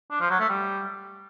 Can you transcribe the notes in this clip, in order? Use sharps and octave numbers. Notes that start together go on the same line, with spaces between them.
D4
F3
F#3
A3
G3